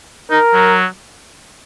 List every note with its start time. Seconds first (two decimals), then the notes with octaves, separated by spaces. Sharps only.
0.31 D#4 A#4
0.54 F#3